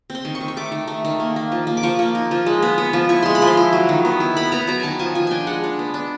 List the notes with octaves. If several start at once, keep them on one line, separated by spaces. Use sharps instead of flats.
C4
C6
D#3
C#6
D#3
C#6
A3 D6
D#3
A3
D#3
A#3
A#3
F3
A#3
D6
F3 C#6
A#3
D#4
F3
G#3
B3
B3
F3
E4 C#6
G#3 C6
B5
F3
C6
E4
F#3
D#3
B3
E4
B3 B5
B3 A#5
F#3 A#5
D#3 G#5 A5
F3 G#5
F3 G#5
D4 G5 G#5
G#3 F#5
D4
B3
D4